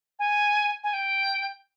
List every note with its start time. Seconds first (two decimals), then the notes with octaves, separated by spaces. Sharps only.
0.19 G#5
0.83 G#5
0.93 G5